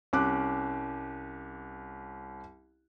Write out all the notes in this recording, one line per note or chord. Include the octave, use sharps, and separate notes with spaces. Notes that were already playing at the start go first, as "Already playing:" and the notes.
C2 C#4 D6 F#6